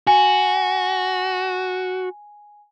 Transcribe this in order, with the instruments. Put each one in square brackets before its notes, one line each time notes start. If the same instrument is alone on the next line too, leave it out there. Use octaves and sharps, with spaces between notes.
[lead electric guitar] F#4 [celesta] G#5